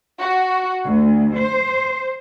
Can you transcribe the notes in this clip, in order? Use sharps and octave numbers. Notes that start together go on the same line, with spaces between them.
F#4
D2
C5